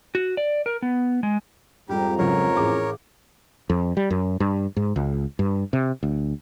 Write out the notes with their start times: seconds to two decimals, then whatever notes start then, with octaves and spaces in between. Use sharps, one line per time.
0.15 F#4
0.37 D5
0.66 A#4
0.82 B3
1.23 G#3
1.89 F2 G#2 G3 G4 A#5
2.19 C#2 F#3 A#4 C#5
2.56 A1 G#4 D6
3.70 F2
3.97 G3
4.11 F#2
4.40 G2
4.77 G#2
4.96 C#2
5.39 G2
5.73 C3
6.03 D2